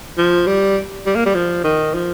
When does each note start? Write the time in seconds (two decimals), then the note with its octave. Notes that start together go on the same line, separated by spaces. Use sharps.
0.18 F3
0.47 G3
1.06 G3
1.15 A#3
1.26 G3
1.35 F3
1.64 D#3
1.94 F3